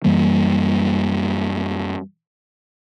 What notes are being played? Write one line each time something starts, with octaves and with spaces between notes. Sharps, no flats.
F#2 E3 G3 A#3